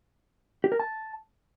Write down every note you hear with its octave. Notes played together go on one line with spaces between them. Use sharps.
G4
A#4
A5